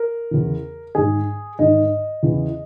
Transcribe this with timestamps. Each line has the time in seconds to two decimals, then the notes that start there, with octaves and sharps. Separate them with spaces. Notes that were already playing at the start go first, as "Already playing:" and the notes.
Already playing: A#4
0.31 E2 C#3 E3
0.95 G#2 D#3 G#4
1.59 G#2 D#3 D#5
2.23 E2 C#3 E3